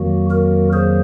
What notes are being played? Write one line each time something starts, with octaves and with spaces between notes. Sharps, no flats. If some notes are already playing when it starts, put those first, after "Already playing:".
Already playing: F2 D#3 F#3 A#3 F#4
F#4 A#4
G#4 C5